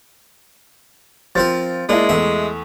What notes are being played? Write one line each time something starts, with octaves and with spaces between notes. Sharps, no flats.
F3 C4 A#4 A6
G#3 A#3 D4 E4
E2 A3 E5